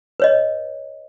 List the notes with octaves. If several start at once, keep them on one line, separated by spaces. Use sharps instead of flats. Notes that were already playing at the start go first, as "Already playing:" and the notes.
B4 C#5 D#5